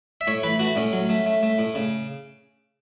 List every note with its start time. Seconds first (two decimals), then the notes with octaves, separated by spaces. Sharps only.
0.21 E5
0.27 A2 C#5
0.43 E3 B4
0.59 A3 F#4
0.76 A2 C#4
0.93 F#3
1.09 A3
1.26 A3
1.43 A3
1.59 A2
1.75 C#3